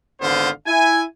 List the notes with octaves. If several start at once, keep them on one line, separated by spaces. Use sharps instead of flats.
G#1 D3 B3 C5 F5
E4 G#5